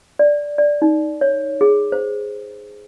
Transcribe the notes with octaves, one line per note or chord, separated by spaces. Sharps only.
D5
D5
D#4
C#5
G#4
C5